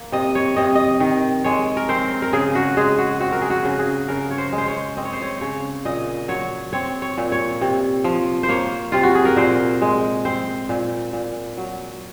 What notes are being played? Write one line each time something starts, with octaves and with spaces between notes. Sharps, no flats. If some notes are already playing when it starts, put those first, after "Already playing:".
Already playing: A#3
C3 D#5
C#5
C3 D#5
D#5
D#3
G#3 C#5
A#4
C4 C5
A#4
C#3 G#4
F#4
G#3 G#4
F#4
C4 F#4
A#4
G#4
F#4
C#3
G#4
C#3 A#4
C#5
C5
G#3
C5
C#5
C4 D#5
C#5
C5
C#5
C#3 C#5
A#2 D#5
F#3 C#5
C4 C#5
C#5
A#2
C#5
C3
F3
C5
A#3 C#5
C3 F4
F#4
G#4
A#4
A#2 C5
G#3
C4 C5
A#2
A#2
F#3